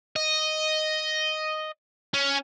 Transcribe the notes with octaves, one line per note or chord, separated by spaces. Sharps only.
D#5
C#4